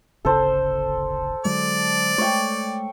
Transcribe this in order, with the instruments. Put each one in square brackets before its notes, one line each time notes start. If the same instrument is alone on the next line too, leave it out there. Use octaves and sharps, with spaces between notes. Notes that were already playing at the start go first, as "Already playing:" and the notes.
[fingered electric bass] D1 G1 C#3 [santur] A4 C5
[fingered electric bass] D3 F#3 G#3 [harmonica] D5
[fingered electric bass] G#3 A3 [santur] C#5 G5